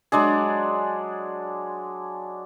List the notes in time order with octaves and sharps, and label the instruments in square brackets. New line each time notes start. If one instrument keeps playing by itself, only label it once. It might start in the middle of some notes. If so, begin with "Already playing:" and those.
[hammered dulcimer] F#3 G#3 D4 G#4